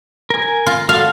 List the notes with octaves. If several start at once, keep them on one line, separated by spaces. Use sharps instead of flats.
A#4 G#5
F4
F#4 A4 F5